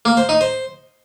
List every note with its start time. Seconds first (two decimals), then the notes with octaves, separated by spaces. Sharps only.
0.05 A#3
0.17 C5
0.29 D#4
0.41 C5